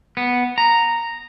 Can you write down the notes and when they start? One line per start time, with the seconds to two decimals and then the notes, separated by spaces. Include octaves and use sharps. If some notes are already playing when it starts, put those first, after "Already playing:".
0.17 B3
0.58 A#5